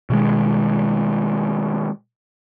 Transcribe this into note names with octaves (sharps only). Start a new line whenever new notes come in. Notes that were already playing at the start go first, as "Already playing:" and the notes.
B2 D#3 G#3